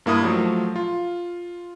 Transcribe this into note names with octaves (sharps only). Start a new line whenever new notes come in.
G2 A#3 E4 D#6
F3 F#3 A3
F4